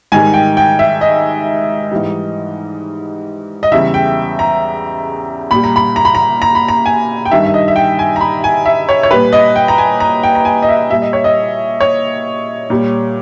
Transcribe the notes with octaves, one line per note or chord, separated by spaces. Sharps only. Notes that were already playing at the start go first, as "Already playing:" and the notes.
G#2 D#3 G3 G#5
G5
G5
E5
D#5
G#2 E3 G3
D#5
E2 C#3 G3 E5
G5
A#5
A#2 G3 B5
A#5
B5
A#5
B5
A#5
A#5
B5
A#5
G#5
G5
G2 D#3 G3 E5
E5
D#5
E5
G5
G#5
A#5
B5
G#5
E5
C#5
C#5
A#2 G3 B4
D#5
G5
A#5
G#5
A#5
G5
A#5
G#5
D#5
E5
A#2 G3 E5
D#5
C#5
D#5
C#5
A#2 G3